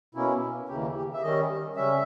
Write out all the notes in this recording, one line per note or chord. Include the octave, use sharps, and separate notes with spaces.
B2 A#3 C#4 E4
D#2 C#3 E3 A#3 G4
G4
E5
D#3 G3 C#4 D#5
C#3 G3 C#4 E5